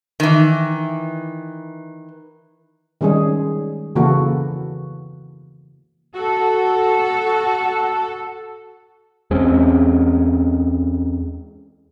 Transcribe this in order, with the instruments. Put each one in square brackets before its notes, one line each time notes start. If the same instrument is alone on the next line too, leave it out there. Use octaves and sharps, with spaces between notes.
[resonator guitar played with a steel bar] D#3 E3
[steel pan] D#3 G3 G#3 C#4 G#4
C#3 E3 A#3 F#4 A4
[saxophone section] F#4 [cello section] A4
[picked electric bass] E2 G#3 C4 C#4